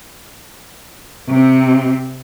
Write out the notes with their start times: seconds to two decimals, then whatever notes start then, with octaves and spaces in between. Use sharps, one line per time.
1.28 C3 C4